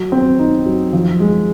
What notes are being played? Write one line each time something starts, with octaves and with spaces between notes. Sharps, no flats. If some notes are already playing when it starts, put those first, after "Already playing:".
Already playing: F#3
C4
D#4
F#3
F3
G#3